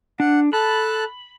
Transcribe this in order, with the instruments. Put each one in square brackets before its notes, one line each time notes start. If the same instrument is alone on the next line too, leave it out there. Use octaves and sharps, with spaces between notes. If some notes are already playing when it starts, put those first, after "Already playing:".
[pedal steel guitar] D4 [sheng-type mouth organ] F#5
[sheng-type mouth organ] A4 A5 F#6 [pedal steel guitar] B5